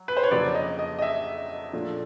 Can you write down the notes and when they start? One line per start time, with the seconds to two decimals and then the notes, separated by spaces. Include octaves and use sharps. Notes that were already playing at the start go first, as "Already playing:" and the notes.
Already playing: F#3
0.08 B4
0.17 C5
0.23 C#5
0.31 F2 C#3 F#3 A#3 D5
0.55 D#5
0.79 D#5
0.99 D#5
1.02 E5
1.73 A#2 F3 A3 D4